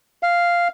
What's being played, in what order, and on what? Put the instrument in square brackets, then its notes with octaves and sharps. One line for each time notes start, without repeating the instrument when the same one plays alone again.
[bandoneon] F5